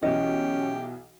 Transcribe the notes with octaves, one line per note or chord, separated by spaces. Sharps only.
B1 E3 C#4 G4 D#5